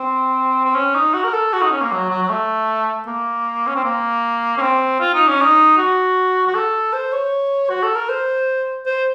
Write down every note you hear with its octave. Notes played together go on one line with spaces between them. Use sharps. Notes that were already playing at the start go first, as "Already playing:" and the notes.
Already playing: C4
C4
C#4
D#4
F#4
A#4
A4
F#4
D#4
C#4
A#3
F#3
F#3
F#3
A3
A#3
C#4
C4
A#3
C#4
C4
F4
D#4
C#4
D#4
F#4
F#4
A4
C5
C#5
F#4
A4
A#4
C5
C5